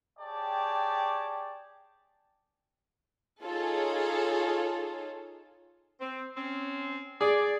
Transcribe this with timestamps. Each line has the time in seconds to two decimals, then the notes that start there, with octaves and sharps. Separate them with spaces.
0.19 G4 G#4 C#5 D5 G5 A5
3.43 D#4 F4 G#4 A4 C#5
6.00 C4
6.36 C4 C#4
7.21 G#4 D5